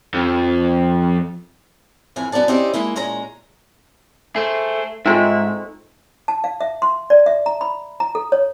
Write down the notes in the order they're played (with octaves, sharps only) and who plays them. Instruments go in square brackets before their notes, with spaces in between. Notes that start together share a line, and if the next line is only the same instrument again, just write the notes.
[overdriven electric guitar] F2
[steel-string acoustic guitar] F2 A2 E3 G#5
F#2 B3 A#4 D5 A5
C4 C#4 D#4 E4 G4 D5
G#3 A#3 E4 D#5
A#2 G#3 C#4 A#5
[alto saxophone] A3 [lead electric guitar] G#4 C5
[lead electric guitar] G#2 [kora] G#3 A3 C4 [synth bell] D#4 F4 [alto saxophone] E5
[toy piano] A5
F5
E5
C6
D5
E5
A#5
B5
A#5
A4
C#5